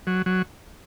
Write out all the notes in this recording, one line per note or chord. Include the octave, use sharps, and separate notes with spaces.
F#3
F#3